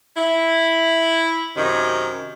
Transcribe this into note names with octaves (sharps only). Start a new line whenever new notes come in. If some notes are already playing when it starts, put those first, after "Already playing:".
E4
F#2 C3 D#3